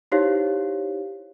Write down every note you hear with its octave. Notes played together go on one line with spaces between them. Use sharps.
D#4 E4 G4 C5 C#5 F5